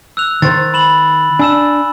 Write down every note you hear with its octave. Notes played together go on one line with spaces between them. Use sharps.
E6 F#6 F7
D#3 C5 A6
B5 E7 F#7
D4 G#5 E6 E7